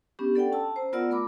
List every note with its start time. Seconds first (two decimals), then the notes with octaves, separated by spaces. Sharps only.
0.19 B3 C#4 D4 G4
0.35 A4 D5 F#5 G5
0.52 C#4 A5 E6
0.76 C5 A#5
0.93 B3 F4 A#4 D5 F#5 E6
1.10 A3 A#4 B5 D6